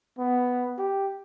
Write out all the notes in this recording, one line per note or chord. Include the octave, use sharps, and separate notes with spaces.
B3
G4